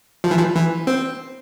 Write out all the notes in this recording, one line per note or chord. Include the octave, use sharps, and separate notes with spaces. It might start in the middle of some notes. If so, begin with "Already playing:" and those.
F3
E3
F3
E3
C4